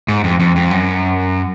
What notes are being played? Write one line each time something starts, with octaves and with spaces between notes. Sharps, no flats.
G#2
F2
F2
F2
F#2